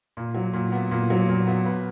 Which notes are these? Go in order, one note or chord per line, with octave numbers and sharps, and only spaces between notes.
A#2
F#3
A#2
B3
A#2
F#3
A#2
B3
B4